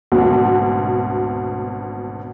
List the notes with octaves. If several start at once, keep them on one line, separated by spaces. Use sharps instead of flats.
G#1 D2 B2